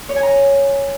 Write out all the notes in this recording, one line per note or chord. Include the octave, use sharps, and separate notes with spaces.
C#5
G#5
A#5